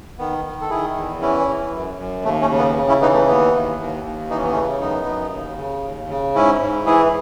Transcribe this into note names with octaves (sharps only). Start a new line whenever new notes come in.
D#3 B3
D#3
A4
D#3 E4 G#4
E2
E3 C#4 E4
E3
F#2
F#2
D#2 A3
A3 C#4
C#3
B3
C#3
C#4 E4
E3 B3 D#4
A3
D#2 B3
D#2
D#2
D#2
E3 D#4
C#4
B3
C#3 A3 C#4
F#2 B3 D#4
F#2
D#2
C#3
D#2
C#3
G#2 C#4 E4
G#2
E3 E4 G#4